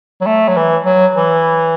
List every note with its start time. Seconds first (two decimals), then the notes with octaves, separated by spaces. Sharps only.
0.21 F#3
0.26 A3
0.48 F#3
0.57 E3
0.85 F#3
1.15 E3